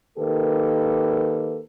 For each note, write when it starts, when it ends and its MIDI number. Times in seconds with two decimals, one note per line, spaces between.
0.18 1.61 51
0.18 1.61 58
0.18 1.61 67
0.18 1.61 69
0.18 1.61 71